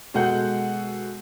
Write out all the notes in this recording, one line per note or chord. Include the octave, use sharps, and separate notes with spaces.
B2 G#3 A4 F#5 G6